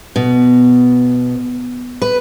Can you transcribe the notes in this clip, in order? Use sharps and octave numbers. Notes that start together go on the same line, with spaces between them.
B2
B4